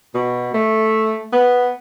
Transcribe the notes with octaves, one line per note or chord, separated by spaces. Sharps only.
B2
A3
B3